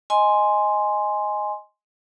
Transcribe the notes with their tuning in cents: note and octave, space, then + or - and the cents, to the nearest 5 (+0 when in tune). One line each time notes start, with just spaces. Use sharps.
D#5 +0 G#5 +0 C6 +0